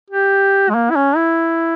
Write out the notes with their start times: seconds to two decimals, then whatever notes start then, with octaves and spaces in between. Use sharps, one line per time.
0.10 G4
0.70 G#3
0.75 A#3
0.91 E4
0.96 C#4
1.16 E4